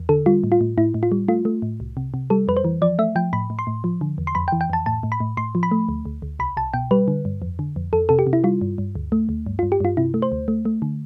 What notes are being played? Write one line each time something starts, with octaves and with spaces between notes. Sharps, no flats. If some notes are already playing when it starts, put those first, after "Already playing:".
Already playing: E2
D3 A4
G3 F4
A2
F4
A2
A2 E4
A2
F4
G3
A3 F4
A3
A2
C2
C3
C3
G3 A4
F2 B4
C5
E3
F3 D5
A3 E5
F3 G5
A2 B5
A2
C6
A2
F3
D3
E2
C6
F2 B5
G5
E3
G5
F2 A5
A2 A5
A2
B5
A2
A2 C6
F3
B5
A3
D2
D2
D2
C2 B5
C2 A5
B2 G5
G3 B4
D3
G2
F2
D3
F2
F2 A4
C3 A4
G4
C3
E4
G3 F4
G2
G2
D2
A3
D2
G2
F4
G2
G4
G2 F4
C3 E4
A3
C5
D2
A3
A3
D3